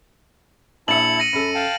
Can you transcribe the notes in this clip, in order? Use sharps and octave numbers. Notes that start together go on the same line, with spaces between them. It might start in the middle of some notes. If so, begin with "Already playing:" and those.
A#1 E4 E5 A5 C#7 F#7
A#6 D#7
F#2 A4 B5
F5 G5 A5